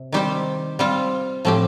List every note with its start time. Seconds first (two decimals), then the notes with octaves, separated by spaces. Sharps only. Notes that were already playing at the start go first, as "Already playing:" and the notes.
Already playing: C3
0.12 D#3 G3 C4 G4 C5
0.79 G3 C4 F4
1.45 A2 F3 C4 G4